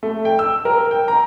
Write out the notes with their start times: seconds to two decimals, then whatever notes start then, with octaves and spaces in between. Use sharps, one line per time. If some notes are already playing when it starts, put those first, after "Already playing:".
0.03 A3
0.25 G5
0.39 E6
0.65 A#4
0.91 G5
1.08 A#5